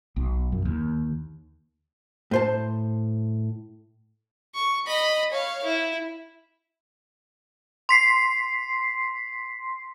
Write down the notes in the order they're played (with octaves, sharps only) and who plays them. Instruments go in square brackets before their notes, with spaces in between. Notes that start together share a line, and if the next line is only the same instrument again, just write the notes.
[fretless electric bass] B1
F#2
D#2
[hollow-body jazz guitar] A2 C5 A5
[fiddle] C#6
D#5 B5
C#5 F5
E4
[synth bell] C6 B6 C7